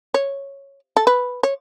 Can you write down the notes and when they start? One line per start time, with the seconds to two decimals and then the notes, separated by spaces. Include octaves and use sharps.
0.14 C#5
0.97 A4
1.07 B4
1.43 C#5